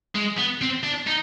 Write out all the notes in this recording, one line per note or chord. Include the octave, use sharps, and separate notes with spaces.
G#3
B3
C4
D4
D#4